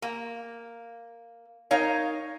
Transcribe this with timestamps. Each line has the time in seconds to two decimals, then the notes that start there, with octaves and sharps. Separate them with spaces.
0.02 A#3
1.71 D#4 A#4 C#5 F5